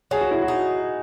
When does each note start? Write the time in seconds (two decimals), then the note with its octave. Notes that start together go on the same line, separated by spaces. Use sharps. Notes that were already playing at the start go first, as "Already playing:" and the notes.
0.11 F#3 G#4
0.21 F#4
0.31 E4
0.42 F#4
0.48 D#4